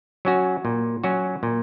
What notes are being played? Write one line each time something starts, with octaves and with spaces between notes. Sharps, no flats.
F#3 C#4 F#4
A#2
F#3 C#4 F#4
A#2